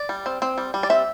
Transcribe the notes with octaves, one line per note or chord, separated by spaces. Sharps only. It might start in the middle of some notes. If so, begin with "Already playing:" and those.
Already playing: D5
G3
C4
C4
G3
G3
D5
C4 E5